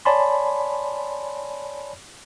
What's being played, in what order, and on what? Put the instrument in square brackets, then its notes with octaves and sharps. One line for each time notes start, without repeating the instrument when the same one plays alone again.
[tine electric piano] C#5 D5 G#5 A5 B5 C6